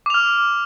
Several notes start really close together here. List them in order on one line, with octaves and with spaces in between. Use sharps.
D6 F7 F6